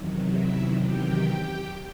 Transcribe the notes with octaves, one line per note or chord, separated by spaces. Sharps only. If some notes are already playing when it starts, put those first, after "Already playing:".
Already playing: E2 C3 D#3 F#3
E4 E5
G4 G5